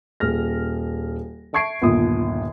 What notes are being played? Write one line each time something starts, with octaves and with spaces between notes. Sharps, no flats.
D#1 G#4 F6 A#6
E5 A5 C#6 G#6 C7 D7
G1 D#2 A#2 D#6